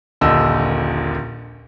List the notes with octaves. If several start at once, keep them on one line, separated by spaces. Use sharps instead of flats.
D#1 A#1 D3 D#5 E6